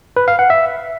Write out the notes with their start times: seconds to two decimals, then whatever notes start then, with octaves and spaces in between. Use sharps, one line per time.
0.17 B4
0.28 F5
0.39 F#5
0.50 E5